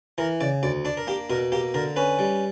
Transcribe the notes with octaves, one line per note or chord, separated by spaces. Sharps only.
E3 A#4
C#3 D5
D2 D5
D4 D5
A#4
A#3 G4
B2 A#4
A#3 G4
D3 A#4
C#4 B4
G3